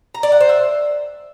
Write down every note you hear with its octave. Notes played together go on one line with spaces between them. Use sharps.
A#5
D5
F#5
C5
E5